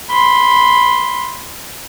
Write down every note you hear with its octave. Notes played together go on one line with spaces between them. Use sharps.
B5 C6